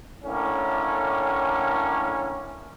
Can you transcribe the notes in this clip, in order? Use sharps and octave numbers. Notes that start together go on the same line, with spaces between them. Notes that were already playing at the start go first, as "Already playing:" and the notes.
A2 D3 A#3 C#4